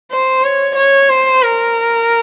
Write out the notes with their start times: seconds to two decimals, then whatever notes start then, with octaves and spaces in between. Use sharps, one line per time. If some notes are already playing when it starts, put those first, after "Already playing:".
0.11 C5
0.44 C#5
0.76 C#5
1.09 C5
1.42 A#4